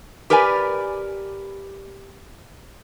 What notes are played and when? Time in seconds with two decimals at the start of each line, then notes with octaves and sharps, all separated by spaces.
0.30 G4 A#4 B4 D5 G#5